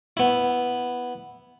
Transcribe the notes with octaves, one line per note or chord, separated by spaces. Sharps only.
B3 E4